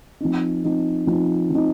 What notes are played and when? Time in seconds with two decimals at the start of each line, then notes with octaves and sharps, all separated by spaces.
0.20 F3 C4 D#4
0.64 F3 C4 D#4
1.07 F3 C4 D#4
1.50 F3 C4 D#4